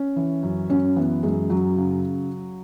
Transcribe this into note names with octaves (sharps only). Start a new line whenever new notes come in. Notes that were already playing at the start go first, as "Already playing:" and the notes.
Already playing: C#4
E3
F#2
F#2 C#4
E3 B3
F#2 G#3
F#2 F#3
C#3